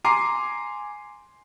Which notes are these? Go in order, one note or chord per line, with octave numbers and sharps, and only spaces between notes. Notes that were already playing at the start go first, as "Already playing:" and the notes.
G#5 A#5 C6 D6 C7